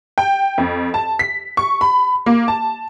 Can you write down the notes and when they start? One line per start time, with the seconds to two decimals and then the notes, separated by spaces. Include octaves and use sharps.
0.18 G5
0.58 F2
0.94 A5
1.19 B6
1.57 C#6
1.81 B5
2.26 A#3
2.48 A5